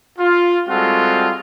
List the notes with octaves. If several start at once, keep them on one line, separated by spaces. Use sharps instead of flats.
F4
G3 G#3 C4 F4 F#4 A4